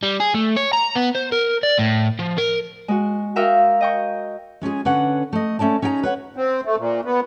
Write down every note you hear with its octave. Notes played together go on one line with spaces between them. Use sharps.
G3
G#4
A3
C#5
A#5
B3
C5
A#4
D5
A2
F3
A#4
G#3 F#4
F#4 A#4 E5 F5 G5 D#6
D#5 G5 C#6
G#3 C#4 F4 G#4
D3 C#4 B4 F#5
A3 D#5
A3 C#4 D5 A5
C#4 D#4 G#4 G5 A#5
B4 C#5 F#5
C4
A3
A#2
B3